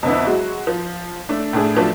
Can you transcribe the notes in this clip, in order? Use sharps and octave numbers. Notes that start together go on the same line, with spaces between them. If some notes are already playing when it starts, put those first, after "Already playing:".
F2 D3 B3 E4
F#3 G#3 F#4
F3
A3 D4
A2 A3 D4 G#4
F3 F#3 A3 D4